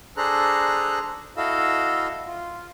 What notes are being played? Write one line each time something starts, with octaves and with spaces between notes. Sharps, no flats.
D4 G#4 A4 C5 A#5 F#6
E4 F#4 A4 D#5 F5 E6
F4